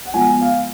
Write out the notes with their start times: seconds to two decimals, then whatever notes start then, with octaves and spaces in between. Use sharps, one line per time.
0.05 F#5
0.14 F3 G#3 B3 F4 G#5
0.41 F5